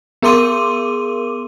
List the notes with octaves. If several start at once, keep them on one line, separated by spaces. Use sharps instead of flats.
B3 G#4 A#4 C6 D6 D#7